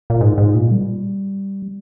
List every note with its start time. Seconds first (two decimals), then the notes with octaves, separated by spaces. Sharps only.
0.10 A#2
0.21 G#2
0.38 G#2
0.55 A#2
0.71 G3